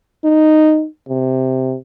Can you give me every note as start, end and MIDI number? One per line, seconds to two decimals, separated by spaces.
0.24 0.86 63
1.09 1.76 48